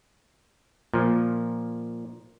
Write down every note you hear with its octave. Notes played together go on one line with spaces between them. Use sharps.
A#2 F3